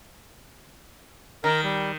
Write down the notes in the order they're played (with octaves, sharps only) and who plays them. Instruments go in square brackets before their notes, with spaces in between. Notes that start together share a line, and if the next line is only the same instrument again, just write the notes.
[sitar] D#3 [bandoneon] A#4
[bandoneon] G3